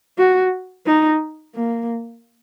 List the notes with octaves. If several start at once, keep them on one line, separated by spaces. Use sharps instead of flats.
F#4
D#4
A#3